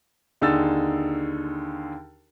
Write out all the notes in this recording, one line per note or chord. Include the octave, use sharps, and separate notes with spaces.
D#2 D3 D#4 G#4 E6 A6